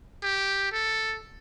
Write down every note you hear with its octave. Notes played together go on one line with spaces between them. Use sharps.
G4
A4